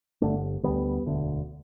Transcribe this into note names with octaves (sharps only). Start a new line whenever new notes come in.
G1 G2 D3 A3 D4
D2 D3 G3 B3
E1 D2 D3